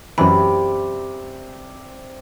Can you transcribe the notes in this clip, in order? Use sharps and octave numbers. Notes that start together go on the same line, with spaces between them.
F#2 C3 E3 D5 B5 D6